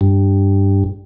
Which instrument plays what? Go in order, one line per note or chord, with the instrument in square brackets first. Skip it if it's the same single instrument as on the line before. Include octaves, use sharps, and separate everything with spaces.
[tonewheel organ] G2